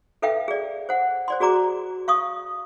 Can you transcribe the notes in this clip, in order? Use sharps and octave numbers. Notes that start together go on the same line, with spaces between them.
A4 B4 E5 F5 G5
G#4 D5
C5 F#5
C5 D5 C6
F#4 G#4 D5 A#5 D6
F5 C#6 D#6